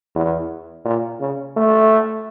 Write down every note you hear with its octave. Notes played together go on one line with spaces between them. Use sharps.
E2
A#2
C#3
A3